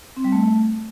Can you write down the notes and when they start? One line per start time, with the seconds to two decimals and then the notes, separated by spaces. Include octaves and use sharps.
0.16 C4
0.24 G3
0.32 A3